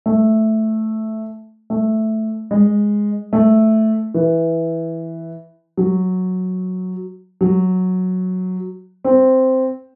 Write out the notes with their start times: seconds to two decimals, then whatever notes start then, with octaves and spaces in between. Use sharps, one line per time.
0.06 A3
1.70 A3
2.51 G#3
3.33 A3
4.14 E3
5.77 F#3
7.41 F#3
9.04 C4